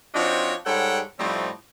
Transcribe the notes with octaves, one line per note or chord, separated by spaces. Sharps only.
F3 C4 D4 D#4 F#4 C#5
G#2 G3 A4 C#5 F#5 G5
A2 F3 G3 A3 C4 D#4